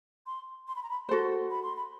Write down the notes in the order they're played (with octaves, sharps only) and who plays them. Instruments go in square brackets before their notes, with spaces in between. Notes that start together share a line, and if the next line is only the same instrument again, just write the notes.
[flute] C6
C6
B5
A#5
B5
[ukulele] F#4 A4 C5 [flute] C6
[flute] B5
C6
B5